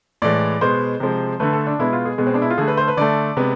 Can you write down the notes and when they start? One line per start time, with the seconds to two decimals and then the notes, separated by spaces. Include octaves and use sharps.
0.22 A2 E3 G#3 D5
0.61 B2 G#3 B3 C5
1.00 C3 F3 G#3
1.40 D3 A3 B4
1.53 A4
1.67 D4
1.79 B2 G#3 B3 E4
1.93 F4
2.05 G#4
2.18 B2 G#3 B3
2.27 C4
2.34 D4
2.42 E4
2.50 F4
2.58 D3 A3 G#4
2.68 B4
2.77 C5
2.88 B4
2.97 D3 A3 D5
3.37 C3 G#3 B3